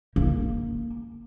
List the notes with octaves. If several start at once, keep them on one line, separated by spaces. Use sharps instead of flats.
A#3